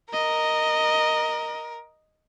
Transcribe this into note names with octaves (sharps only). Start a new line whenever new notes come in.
A#4 D#5